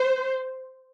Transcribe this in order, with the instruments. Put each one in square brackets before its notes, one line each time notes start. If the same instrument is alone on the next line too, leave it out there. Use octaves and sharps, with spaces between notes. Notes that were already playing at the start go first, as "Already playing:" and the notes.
Already playing: [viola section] C5